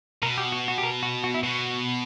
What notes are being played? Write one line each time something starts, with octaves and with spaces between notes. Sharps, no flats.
B2 A#4
G4
F#4
F#4
G4
A#4
F#4
F#4
E4
B2 F#4